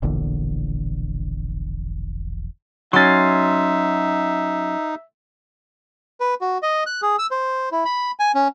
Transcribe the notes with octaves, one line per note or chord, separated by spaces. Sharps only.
E1 A#1 E2 D3
F#3 C#4 D#4 E5 C6 A6
B4
F#4
D#5
F#6
G#4
E6
C5
E4
B5
G#5
C#4